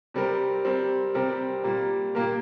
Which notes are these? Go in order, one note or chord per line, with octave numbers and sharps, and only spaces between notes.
C3 G3 C4 A#4
G3 C4 A#4
C3 G3 C4 G4 A#4
A#2 G3 A#3
A#2 A#3 G4 A#4